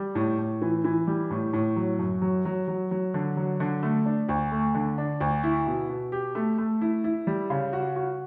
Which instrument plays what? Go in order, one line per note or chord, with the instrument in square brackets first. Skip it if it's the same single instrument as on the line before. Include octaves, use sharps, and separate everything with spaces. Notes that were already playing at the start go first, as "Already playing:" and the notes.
Already playing: [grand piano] G3
A2
A2
E3
E3
G3
A2
A2
F#3
F#2
F#3
F#3
F#3
F#3
D3
F#3
D3
A3
D4
D2
A3
D3
D4
D2
E4
B2
B2
G4
A3
A3
E4
E4
G3
C#3
F#4
F#4